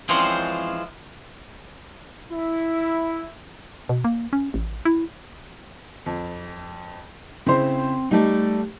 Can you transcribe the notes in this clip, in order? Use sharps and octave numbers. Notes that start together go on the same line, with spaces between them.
E3 F3 G#3 C4 C#4 C5
E4
B2
A#3
C#4
A1
E4
F2
C#3 C4 E4 C5
G3 A3 D#4 D5